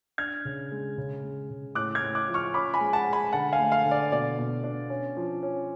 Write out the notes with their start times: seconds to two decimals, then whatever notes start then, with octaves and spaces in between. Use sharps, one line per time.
0.18 D4 F6 G#6
0.45 C#3
0.72 G#3
0.98 C#3
1.23 G#3
1.50 C#3
1.75 A2 D6 F#6
1.95 F6 G#6
2.02 A2
2.15 D6 F#6
2.28 F3
2.34 C#6 F6
2.54 C#4 B5 D6
2.74 G#5 B5
2.80 G#3
2.93 F#5 A5
3.07 G#3
3.13 G#5 B5
3.33 D3 F#5 A5
3.53 F5 G#5
3.59 A3
3.72 F5
3.85 D3
3.91 D5
4.11 B2 D5
4.38 B2
4.64 D4
4.90 C#4
5.17 F3
5.43 C#4